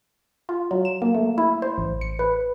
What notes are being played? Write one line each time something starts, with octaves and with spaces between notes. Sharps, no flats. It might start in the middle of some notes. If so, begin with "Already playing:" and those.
F4
F#3
E7
A#3
A3
E4
C5
A1
C#7
B4